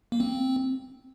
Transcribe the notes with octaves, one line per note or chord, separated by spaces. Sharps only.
A#3
C4